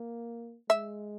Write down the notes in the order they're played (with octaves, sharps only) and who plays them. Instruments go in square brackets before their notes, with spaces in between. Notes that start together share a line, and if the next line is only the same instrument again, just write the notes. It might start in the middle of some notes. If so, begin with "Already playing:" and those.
Already playing: [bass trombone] A#3
[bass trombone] G#3 [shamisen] E5